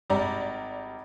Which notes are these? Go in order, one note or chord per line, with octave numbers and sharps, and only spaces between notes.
G#1 G3 D5 A#5